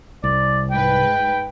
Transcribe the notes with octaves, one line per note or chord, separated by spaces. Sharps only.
C2 D5
G#2 B4 G5